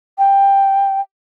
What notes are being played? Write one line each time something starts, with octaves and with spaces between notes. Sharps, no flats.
G5